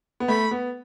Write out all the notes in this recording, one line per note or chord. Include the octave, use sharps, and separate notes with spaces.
B3
A3 B5
B3